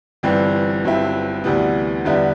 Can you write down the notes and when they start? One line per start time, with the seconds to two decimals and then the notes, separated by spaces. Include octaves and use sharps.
0.23 G1 G2 E3 G3 C4
0.84 G1 G2 F#3 C4 E4
1.44 D2 C3 E3 G3 B3
2.05 E2 D3 G3 B3 E4